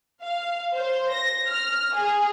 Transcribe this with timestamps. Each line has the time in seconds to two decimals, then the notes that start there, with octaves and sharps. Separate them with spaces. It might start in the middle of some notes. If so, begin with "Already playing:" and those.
0.22 F5
0.74 C5
1.12 A#6
1.49 F6
1.95 G#4